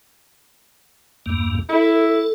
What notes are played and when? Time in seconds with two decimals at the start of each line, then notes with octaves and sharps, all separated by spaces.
1.26 E2 G2 A#3
1.69 E4 A4